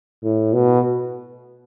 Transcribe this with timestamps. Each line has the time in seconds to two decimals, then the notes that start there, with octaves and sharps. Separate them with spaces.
0.23 A2
0.53 B2